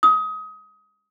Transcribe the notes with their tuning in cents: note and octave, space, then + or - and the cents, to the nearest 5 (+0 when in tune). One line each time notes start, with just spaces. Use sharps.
D#6 +25